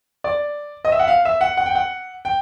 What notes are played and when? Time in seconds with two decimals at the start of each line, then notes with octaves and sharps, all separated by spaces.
0.24 D5
0.85 D#5
0.92 E5
0.99 F#5
1.08 F5
1.25 E5
1.41 F#5
1.57 F#5
1.66 G5
1.75 F#5
2.25 G5